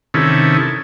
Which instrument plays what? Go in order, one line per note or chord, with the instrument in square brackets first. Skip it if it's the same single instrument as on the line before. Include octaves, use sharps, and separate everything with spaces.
[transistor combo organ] C3 D#3 C#4 E4 A4